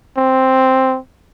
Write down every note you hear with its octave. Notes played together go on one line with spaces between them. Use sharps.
C4